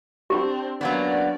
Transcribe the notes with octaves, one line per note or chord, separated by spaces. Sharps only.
C4 D4 G4
F#3 A#3 B3 C#4 D4 D5